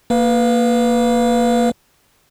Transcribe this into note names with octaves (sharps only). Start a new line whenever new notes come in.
A#3 B4 F5